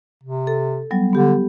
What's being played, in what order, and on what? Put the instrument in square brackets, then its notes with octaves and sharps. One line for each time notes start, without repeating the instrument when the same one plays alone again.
[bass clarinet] C3
[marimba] A4
F#3 G3 B3
[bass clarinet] D3 [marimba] B3 G4 A4